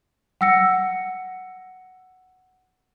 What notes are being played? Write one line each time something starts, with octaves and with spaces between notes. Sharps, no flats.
F#5 G5 E6 A#6 C#7